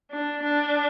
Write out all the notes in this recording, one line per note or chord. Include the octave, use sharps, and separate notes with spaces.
D4
D4